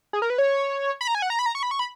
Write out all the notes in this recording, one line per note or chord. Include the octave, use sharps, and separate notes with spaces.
G#4
A#4
B4
C#5
B5
A#5
G#5
F#5
A#5
B5
A#5
C#6
B5
C#6
B5